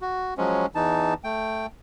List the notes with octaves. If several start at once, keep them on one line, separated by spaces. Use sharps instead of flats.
F#4
F3 F#3 G#3 C#4
E2 E3 D#4 A5
A3 G5